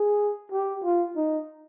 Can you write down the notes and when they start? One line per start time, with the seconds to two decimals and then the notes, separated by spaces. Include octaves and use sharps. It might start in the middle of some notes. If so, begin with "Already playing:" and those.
Already playing: G#4
0.52 G4
0.84 F4
1.16 D#4